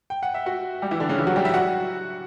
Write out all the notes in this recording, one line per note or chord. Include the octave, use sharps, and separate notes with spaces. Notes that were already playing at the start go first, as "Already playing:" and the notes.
G5
F#5
E5
F#4 F#5
G3 G4
E3 E4
D3 D4
C#3 C#4
E3 E4
F#3 F#4
G3 G4
E4 E5
F#4 F#5